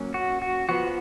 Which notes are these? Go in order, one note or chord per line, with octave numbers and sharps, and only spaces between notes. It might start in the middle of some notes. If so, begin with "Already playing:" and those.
Already playing: F#3 A#3 C#4
F#4
F#4
F3 B3 F#4